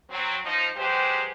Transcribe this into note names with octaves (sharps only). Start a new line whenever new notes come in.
F#3 C4
F3 D#4
F#3 G#3 G4 B4 C5